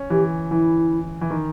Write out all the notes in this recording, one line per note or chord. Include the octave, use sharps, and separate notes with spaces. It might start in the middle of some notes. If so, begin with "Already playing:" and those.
Already playing: C#4
E3 G4
E3 E4
E3
D#3